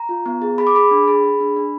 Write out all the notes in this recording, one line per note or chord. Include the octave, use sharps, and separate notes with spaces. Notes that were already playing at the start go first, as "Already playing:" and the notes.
Already playing: A#5
F4
B3
G#4
G#4 B5
D6
G#4 B5
D4
G#4
G#4
D4
D4